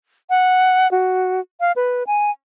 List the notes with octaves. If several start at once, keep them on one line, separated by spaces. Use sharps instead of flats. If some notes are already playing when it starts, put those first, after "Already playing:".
F#5
F#4
F5
B4
G#5